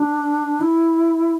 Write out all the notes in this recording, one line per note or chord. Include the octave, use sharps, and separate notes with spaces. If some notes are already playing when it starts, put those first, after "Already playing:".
Already playing: D4
E4